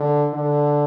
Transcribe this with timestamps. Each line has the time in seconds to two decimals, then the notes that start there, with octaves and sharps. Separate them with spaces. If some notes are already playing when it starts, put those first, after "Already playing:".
Already playing: D3
0.34 D3